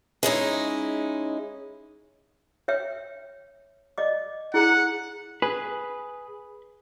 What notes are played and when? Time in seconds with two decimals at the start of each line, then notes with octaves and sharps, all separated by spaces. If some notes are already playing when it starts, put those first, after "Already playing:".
0.23 G#3 C#4 D#4 E4
2.68 C#5 E5 G5
3.98 D5 D#5 D6
4.54 E4 G#4 F#5 A#5
5.42 G#4 B4